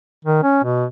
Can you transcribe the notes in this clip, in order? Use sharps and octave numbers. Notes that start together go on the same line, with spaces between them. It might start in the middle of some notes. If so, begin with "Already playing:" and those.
D#3
C#4
B2